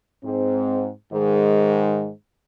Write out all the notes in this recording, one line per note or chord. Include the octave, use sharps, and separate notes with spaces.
G#2 C4
G#2 D#3 G#3